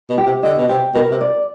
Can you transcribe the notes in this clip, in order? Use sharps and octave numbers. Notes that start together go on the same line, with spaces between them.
B2
G4
C3
D3 D#5
B2
C3 G5
B2 A#4
C3
D5